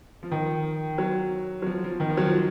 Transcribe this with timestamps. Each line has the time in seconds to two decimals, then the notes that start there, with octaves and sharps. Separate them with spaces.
0.23 F3
0.31 D#3
0.98 F#3
1.62 F#3
1.66 F3
1.84 F3
2.00 D#3
2.09 F3
2.17 F#3
2.26 F3